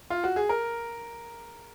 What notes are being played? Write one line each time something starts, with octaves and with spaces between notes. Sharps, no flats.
F4
F#4
G#4
A#4